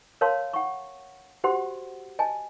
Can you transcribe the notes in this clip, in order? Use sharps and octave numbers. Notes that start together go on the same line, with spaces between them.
A#4 C#5 F5 A5 C6
F#5 C#6
F#4 G4 C5 F#5 C6
D#5 G#5 A5